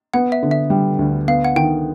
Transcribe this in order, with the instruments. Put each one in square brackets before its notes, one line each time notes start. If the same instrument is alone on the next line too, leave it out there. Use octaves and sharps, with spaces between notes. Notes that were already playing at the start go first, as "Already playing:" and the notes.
[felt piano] B3 [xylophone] F#5
[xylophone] E5
[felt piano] D3
[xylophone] E5
[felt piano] G3
D2
[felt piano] B3 [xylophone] F5
[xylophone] F#5
[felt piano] D#3 [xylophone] G5